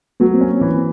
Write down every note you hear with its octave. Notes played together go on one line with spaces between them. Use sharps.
F#3 A3 B3
A#3 C4
C#4
E3